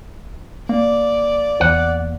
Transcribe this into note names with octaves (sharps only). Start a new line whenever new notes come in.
A#3 D5
E2 F#5